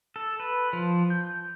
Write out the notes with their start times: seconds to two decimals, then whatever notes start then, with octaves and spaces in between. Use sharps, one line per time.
0.16 A4
0.40 B4
0.73 F3
1.10 G6